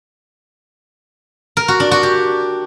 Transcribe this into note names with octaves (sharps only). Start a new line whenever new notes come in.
A#4
F#4
D4
F#4
G4